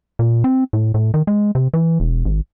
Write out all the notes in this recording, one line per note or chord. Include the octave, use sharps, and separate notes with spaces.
A#2
C4
A2
A2
D#3
G#3
C3
E3
E1
G#1